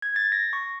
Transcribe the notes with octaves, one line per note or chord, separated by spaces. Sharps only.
G#6
A6
A#6
C#6